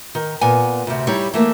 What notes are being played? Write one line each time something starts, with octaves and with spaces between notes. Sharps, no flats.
D#3
A#2 B3 G#5
D2 C3
G3 D#4 E4 C#5
E3 A3 A#3